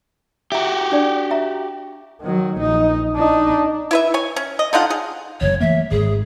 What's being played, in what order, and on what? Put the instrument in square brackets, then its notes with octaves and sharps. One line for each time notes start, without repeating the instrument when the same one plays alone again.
[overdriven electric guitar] F#4 G4 [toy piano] E5 A#5
[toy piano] D4 D#4 D5
E5 A#5
[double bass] D#3 F#3
A#1 D#4
D4 D#4
[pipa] E4 B4 E5
C#5 G#5
C#4
D#5
D3 D#4 F4 F#5
G#4
[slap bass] F#1 E2 [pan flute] C#5
[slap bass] E3 A3 A#3 [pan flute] E5
[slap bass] G#1 G#2 [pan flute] G#4